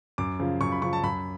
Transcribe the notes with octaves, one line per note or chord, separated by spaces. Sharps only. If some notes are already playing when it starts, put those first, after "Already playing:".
F#2 D6
C#3 F3
F#2 C#6
B5
C#3 F3 C#6
A5
F#2 B5